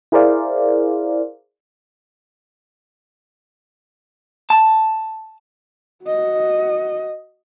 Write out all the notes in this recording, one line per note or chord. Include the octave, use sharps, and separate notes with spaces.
E4 G#4 A#4 C5 D5 F5
A5
F#4 D#5